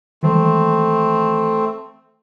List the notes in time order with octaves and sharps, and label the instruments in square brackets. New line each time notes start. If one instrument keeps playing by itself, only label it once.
[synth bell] D#3 E3 [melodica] A3 C4